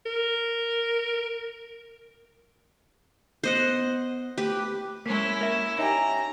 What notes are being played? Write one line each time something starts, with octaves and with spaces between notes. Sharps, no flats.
A#4
B3 C5 D#5 F#5
A3 G4 B4
G#3 A#3 C#4 E4 B6
A#4 E5
D#4 G4 C#5 E5 G#5 A#5